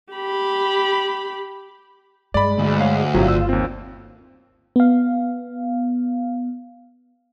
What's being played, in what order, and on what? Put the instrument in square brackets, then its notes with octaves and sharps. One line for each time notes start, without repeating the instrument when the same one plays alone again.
[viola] G4 B5
[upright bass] G2 [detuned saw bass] G#3 [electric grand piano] D5 B5
[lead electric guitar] D2
[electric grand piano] C#5 F5
[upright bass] G1 [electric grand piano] A2 C3 F#3 [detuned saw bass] F4
[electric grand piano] E6
D#2 C4
[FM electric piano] B3 F5